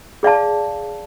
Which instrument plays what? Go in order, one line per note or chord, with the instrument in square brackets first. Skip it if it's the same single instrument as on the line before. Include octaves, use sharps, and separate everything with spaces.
[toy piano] G#4 D5 F5 A5